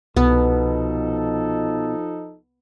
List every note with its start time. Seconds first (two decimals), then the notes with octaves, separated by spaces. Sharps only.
0.17 C2 B2 F3 B3 D#4 A4